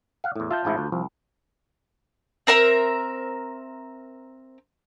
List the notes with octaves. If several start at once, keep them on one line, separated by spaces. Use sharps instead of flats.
F5 F#5
E2 A2
F4 E5 A5 G6
A1 G#2 E4
D2
C2 F3
C4 A#4 E5 A#5